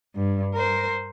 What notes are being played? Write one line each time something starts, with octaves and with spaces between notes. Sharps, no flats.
G2
A#4 C5